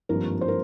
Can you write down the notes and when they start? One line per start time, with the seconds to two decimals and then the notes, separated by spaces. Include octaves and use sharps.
0.09 G#1 G2 F3 A#3 A#4
0.41 C5
0.48 A#4